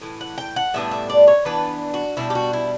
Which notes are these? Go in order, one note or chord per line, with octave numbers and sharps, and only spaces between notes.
A2 E3
F#5
G5
F#5
A2 G3 B3 D4 E5
E5
D5
C#5
E3 B3 D4 B4
F#4
B2 G3 D4 E4
G4
F#4
E4